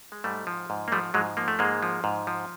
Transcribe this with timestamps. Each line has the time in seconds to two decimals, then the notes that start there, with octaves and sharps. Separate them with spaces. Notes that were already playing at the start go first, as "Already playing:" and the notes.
0.12 G#3
0.24 G#2 G3 A3
0.47 F3
0.70 G#2
0.88 A#3
0.92 F3 G3 A3
1.14 G#2 F#3 G#3
1.37 F3 A#3
1.48 A3
1.59 G#2 G#3 A#3
1.83 F3
2.04 G#2
2.27 F3